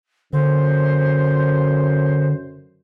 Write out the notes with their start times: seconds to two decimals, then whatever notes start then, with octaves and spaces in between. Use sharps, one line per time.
0.33 F#2 D3 C5